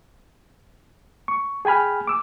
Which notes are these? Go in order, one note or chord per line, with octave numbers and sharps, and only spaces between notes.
C#6
G#4 G5 G#5 B5 F6
D6 E6